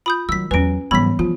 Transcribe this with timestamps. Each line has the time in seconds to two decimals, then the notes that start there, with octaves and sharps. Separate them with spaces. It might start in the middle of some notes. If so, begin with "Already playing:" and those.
0.06 F4 B5 D#6 G6
0.29 D#3 F#3 E6 B6
0.51 E2 F#3 C#4 B4 G#5 D7
0.91 G#2 E3 F#3 G3 B3 B5 B6
1.19 F3 F4